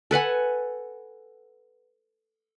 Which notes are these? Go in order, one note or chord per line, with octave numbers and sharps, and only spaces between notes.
A4 B4 F#5 G#5